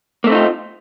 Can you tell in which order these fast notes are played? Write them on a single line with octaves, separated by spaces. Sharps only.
A#3 A3 C4 D#4 F4